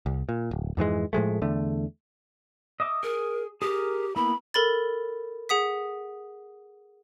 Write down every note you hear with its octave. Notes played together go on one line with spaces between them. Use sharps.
C2
A#2
D1
F2 G#2 E3 G#3
A2 F3 G#3 A3
E2 D3 A3
D#5 E5 D6
G#4 A#4
G4 G#4 A#4
A#3 B3 E4 B5
A4 A#4 B5 A6
G#4 F#5 D#6 B6